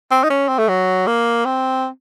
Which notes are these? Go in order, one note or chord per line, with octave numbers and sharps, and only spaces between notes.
C4
D#4
C#4
C4
A3
F#3
A#3
C4